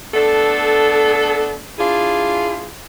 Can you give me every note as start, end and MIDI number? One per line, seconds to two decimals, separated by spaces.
0.14 1.59 57
0.14 1.59 59
0.14 1.59 62
0.14 1.59 69
1.78 2.68 62
1.78 2.68 64
1.78 2.68 65
1.78 2.68 68